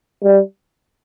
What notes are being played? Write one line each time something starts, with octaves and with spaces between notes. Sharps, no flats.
G3